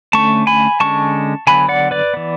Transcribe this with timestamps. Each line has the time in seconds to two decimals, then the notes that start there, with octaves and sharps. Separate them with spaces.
0.13 D3 A3 C#4 A5 C#6
0.47 G#5 B5
0.80 D3 G#3 C#4 A5 C#6
1.47 D3 F#3 B3 G#5 B5
1.69 D5 F#5
1.91 B4 D5
2.14 E3 B3